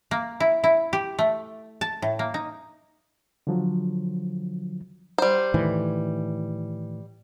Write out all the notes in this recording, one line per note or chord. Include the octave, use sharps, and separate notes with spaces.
A#3
E4
E4
G4
A3
A5
A2
A#3
D#4
D3 F3 F#3
G3 C5
A2 D#3 E3